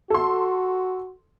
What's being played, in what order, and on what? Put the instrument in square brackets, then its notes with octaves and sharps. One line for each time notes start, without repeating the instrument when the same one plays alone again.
[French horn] F#4 [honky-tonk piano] A4 C6